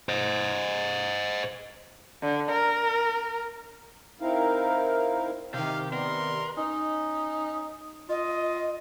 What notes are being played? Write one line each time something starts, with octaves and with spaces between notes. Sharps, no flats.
C5 D#5
D3
A#4
C4 D#4 E4 A#4 F5
C3 D#3 G4 F5
B3 A#4 D5 C6
C#4 D#4
F4 D#5